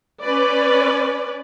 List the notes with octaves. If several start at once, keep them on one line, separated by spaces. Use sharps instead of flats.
C#4 B4 D5